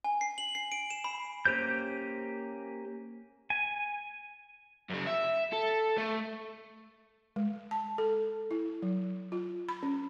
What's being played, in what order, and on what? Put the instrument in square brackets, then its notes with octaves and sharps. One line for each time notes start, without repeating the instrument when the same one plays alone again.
[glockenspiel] G#5
C7
F#7
C7
D7
E7
B5
[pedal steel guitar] A#3 C#4 G4 C5 G6
G#5
[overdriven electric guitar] F#2 C#3
E5
A4
A3
[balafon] G#3
A5
A4
E4
F#3
F4
B5
C#4